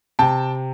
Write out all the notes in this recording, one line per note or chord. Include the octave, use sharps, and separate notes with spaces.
C3 G5 A5